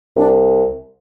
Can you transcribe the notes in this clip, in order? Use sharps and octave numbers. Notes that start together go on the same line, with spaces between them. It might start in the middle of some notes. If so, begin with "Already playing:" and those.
C2 D4